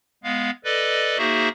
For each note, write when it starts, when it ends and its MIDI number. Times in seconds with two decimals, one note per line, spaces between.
0.24 0.50 56
0.24 0.50 59
0.24 0.50 77
0.64 1.18 69
0.64 1.18 71
0.64 1.18 74
0.64 1.18 75
1.18 1.49 58
1.18 1.49 63
1.18 1.49 66
1.18 1.49 68
1.18 1.49 72
1.18 1.49 76